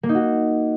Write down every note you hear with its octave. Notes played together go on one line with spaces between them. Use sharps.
A#3
D#4
F#4